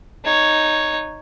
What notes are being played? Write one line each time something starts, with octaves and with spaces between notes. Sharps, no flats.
D#4 C#5